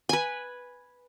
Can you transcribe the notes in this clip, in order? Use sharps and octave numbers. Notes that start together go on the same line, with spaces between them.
B4 G#5